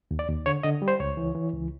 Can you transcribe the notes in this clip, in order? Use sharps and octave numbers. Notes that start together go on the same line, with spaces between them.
D#2
D5
D#2
D3 C#5
D3 D#5
G3
C5
C#2 C#5
E3
E3
C#2